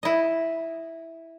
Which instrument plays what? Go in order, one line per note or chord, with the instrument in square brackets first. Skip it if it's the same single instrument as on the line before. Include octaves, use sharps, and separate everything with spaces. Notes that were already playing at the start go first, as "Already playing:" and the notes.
[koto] E4 D#5